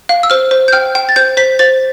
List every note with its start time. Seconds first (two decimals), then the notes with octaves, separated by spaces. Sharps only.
0.09 F5
0.23 E6
0.30 C5 F6
0.51 C5
0.68 G6
0.73 G5 F6
0.95 G5
1.09 A6
1.16 C5 G6
1.37 C5 B6
1.59 C5 A6